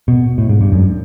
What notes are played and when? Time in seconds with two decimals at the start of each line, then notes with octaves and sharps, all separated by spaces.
0.08 B2
0.38 A2
0.49 G#2
0.61 G2
0.72 F#2